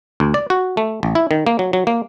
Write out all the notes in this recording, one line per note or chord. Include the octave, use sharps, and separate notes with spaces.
D2
D5
F#4
A3
A1
E4
D#3
A#3
F#3
F#3
A#3